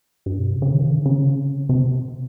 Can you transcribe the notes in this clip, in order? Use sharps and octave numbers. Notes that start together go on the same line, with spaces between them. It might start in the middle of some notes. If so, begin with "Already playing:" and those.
G2
B2
C3
C#3
D#3
D3
C#3
C3